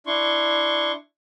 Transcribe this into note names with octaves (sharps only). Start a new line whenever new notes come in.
D4 E4 C6 C#6